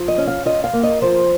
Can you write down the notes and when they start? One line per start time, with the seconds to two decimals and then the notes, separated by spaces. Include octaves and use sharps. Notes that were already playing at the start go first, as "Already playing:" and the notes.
Already playing: F3
0.08 D#5
0.18 C#4
0.27 F5
0.46 F4 D#5
0.64 F5
0.73 A#3
0.83 D#5
1.02 F3 C5